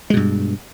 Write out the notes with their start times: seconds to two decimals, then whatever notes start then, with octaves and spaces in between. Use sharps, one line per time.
0.10 G#3
0.13 B2
0.17 G2